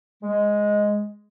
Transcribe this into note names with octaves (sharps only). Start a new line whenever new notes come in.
G#3